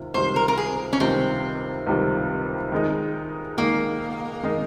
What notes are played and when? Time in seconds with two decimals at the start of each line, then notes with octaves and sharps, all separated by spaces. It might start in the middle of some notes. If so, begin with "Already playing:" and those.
Already playing: C#2 C3 D#3
0.14 C#2 C3 D#3 G3 C5
0.36 A#4
0.48 A#4
0.58 G#4
0.93 C#4
1.00 C#2 C3 D#3 G3 C4
1.87 C#2 C3 D#3 G3
2.72 D#3 G#3 D#4
3.58 D#3 G#3 A#3 D#4
4.43 D#3 G#3 D#4